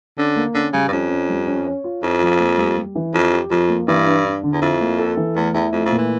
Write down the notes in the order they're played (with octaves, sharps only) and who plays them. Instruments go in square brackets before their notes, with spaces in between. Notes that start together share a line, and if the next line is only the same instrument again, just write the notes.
[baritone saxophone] D3 [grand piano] C#4
[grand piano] A#3
[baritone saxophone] D3 [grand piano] C#4
[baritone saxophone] C#3 [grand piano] G3
[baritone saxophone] G2
[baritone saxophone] F2 [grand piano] C#4
[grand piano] C#4
G3
C#4
C#5
F4
[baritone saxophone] F2 [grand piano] E4
[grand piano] F3
A#3
G3
G3
E3
[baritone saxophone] F2 [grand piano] E4
[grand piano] G4
[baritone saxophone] F2 [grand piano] F3
[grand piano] A#3
[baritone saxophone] G2 [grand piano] E3
[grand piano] D4
D4
D3
[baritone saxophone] E2
[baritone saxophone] F2 [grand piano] E4
[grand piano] A#3
A4
E3
[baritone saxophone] E2 [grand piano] A3
[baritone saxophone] E2 [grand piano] E4
[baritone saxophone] F2 [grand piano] A3
[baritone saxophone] F2
[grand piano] A#2
[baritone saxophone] E3